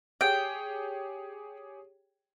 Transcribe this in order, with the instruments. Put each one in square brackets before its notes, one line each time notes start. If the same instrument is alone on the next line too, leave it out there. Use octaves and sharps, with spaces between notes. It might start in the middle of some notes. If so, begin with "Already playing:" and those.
[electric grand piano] G4 G#4 C#5 [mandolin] G5